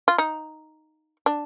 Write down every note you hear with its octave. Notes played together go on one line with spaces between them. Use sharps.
F4
D#4
D4